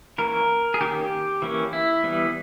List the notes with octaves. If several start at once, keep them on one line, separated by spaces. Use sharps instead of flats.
E3 A#3 C#4 A#4
G#4
D#3 A#3 C#4 G4
E3 A#3 C#4
E4
E3 G3 B3